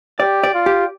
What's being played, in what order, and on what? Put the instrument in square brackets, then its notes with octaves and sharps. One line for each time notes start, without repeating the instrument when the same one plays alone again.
[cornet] G4 [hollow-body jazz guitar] D5
[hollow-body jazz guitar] D5
[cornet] F4
[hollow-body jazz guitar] G4